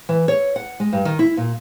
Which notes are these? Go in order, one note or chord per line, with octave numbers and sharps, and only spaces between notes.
E3
C#5
F#5
G#3
G2
D#3
E4
A#2